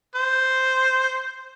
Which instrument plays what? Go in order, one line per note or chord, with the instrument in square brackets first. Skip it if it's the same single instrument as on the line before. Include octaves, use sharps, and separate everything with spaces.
[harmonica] C5